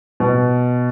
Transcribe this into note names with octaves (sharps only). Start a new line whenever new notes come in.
B2